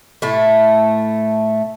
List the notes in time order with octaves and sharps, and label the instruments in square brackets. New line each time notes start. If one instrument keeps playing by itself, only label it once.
[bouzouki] A2 A3